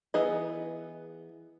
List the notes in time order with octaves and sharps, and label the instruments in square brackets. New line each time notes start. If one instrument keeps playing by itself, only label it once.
[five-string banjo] E3 B3 G#4 D#5